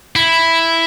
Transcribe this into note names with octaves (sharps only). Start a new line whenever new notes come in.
E4